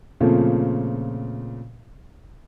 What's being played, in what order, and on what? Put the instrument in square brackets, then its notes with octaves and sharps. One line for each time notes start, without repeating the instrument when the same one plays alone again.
[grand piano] A#2 C#3 F3 A3 C4